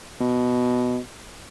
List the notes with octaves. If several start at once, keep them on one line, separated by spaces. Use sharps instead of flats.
B2